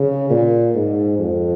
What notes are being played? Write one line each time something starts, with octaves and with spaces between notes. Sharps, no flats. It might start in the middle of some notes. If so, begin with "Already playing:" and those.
Already playing: C#3
A#2
G#2
F2